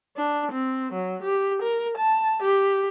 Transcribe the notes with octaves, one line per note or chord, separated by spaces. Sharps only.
D4
C4
F#3
G4
A#4
A5
G4